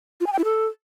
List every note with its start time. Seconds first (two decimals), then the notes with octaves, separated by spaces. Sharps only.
0.21 F4
0.27 G#5
0.33 G5
0.39 E4
0.45 A4